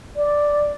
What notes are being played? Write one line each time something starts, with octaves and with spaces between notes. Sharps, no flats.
D5